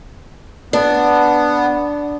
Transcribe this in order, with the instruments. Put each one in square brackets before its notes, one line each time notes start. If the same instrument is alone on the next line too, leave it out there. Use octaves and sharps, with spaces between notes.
[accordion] B3 [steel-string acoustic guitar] D4